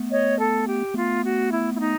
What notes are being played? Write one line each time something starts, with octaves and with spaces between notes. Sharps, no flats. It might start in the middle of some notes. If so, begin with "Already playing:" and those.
Already playing: A3 B3
C#5 D#5
A4
G4
A3 B3 F4
F#4
E4
E4
D#4